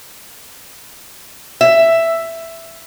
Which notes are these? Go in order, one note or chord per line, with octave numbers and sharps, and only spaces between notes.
E5